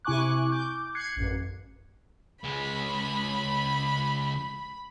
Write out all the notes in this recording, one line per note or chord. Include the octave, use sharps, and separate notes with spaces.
C3 E4 G#5 C#6 D6 F#6
D6 G6
F#6 G#6 C7 C#7
A1 F#2
C#2 G#3 B5